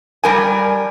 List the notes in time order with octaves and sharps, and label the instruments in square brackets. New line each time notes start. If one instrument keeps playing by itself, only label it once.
[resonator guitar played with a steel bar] G3 A#4 G#5